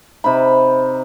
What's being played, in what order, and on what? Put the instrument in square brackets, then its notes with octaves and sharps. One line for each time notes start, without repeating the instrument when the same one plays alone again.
[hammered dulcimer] C3 D#4 B5